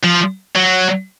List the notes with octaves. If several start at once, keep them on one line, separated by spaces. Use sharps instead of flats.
F3
F#3